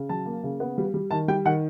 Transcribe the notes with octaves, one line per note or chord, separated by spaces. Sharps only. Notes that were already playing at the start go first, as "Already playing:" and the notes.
Already playing: C#3
F#3 A5
A#3
C#3
B3
G3
G3
D#3 A5
G3 G5
D#3 F#5